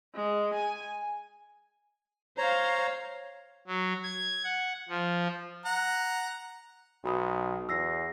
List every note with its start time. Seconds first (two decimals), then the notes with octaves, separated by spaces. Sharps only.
0.15 G#3
0.54 G#5
2.38 C5 C#5 F5 A#5
3.67 F#3
4.03 G#6
4.44 F#5
4.89 F3
5.65 F#5 A#5
7.04 B1 F#4 B5 D#6
7.69 E2 E6 A#6 C7